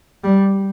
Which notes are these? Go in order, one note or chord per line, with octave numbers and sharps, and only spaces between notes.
G3